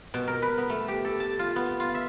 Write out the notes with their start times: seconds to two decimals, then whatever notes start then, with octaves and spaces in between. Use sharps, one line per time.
0.14 B2
0.28 A#4
0.42 B4
0.58 B3
0.70 A3
0.88 G4
1.05 A4
1.20 A5
1.39 F4
1.56 B3
1.80 F4
1.94 E5